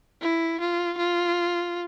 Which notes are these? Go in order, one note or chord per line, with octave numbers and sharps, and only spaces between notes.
E4
F4
F4